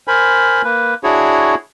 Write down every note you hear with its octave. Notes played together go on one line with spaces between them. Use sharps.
A#4 C5 G#5 B5
A#3 B4
D4 E4 F#4 G#4 C#5